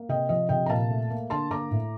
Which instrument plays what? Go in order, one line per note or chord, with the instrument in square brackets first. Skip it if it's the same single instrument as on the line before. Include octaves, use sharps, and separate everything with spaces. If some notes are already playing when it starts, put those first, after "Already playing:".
Already playing: [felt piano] A#3
C3 D#5 G5
F3 D#5
C3 D#5 G5
A#5
A#2 F5 A5
A3
A#3
D3 A5 C6
A#3 A#5 D6
A2